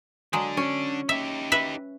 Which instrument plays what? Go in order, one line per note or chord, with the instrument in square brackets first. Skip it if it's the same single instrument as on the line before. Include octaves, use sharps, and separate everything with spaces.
[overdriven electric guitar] D3 D4 [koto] F#3 G#3
[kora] C#4
[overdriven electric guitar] D#4 G4 [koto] E5
[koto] B4 E5